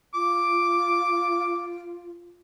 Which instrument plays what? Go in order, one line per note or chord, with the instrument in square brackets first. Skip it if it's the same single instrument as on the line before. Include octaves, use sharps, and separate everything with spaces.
[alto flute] F4 [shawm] D6